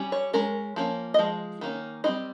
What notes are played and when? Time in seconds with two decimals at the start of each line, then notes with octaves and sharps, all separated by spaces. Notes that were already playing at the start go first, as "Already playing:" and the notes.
Already playing: G3 C#4
0.12 C#5
0.33 G#3 C#4 A#4
0.76 F3 A#3 C#4
1.14 D#5
1.19 F3 G#3
1.61 D#3 A#3 C#4
2.04 G3 C4 D#4 D#5